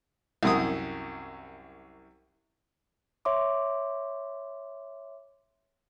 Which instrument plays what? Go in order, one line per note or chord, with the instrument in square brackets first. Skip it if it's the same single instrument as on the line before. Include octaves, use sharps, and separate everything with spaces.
[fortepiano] C2 F#2 D#6
[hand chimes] C#5 E5 C6 D6